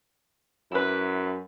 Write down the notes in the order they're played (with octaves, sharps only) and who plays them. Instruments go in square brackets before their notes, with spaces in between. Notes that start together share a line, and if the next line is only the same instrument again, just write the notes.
[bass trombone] F#2 [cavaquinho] E4 B4